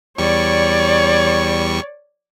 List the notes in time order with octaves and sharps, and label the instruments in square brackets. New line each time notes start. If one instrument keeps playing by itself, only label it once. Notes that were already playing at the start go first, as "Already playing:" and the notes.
[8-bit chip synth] E2 G3 C#6 [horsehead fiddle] C#5 D5